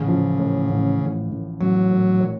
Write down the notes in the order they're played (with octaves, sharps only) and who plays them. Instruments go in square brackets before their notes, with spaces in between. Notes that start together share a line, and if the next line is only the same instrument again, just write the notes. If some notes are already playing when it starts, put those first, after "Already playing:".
Already playing: [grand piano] A1 [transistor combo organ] C#3
[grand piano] F3
A2
A1
A1
A1
[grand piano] A1 [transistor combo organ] F#3
[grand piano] A2
A2